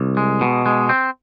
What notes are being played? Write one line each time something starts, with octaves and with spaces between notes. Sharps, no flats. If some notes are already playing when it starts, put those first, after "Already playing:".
Already playing: C2
G#3
B2
G#3
C4